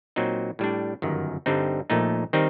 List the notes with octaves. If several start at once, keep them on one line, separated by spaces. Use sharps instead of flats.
A#2 F#3 C4 D#4
A2 G3 D4
G1 F#2 D#3
G2 D3 G3 C4 D#4
A#1 A#2 A3 D#4
D#3 G3 C4 D#4